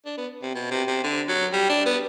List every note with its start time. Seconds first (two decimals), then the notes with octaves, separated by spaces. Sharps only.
0.05 D4
0.18 B3
0.42 C3
0.55 B2
0.71 C3
0.88 C3
1.04 D3
1.29 F#3
1.53 G3
1.69 D4
1.86 B3